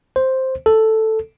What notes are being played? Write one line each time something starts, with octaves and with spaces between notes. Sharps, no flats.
C5
A4